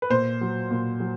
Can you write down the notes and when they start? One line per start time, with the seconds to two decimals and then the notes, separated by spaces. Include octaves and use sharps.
0.02 B4
0.10 A#2 C5
0.41 F#3
0.71 A#2
1.00 F#3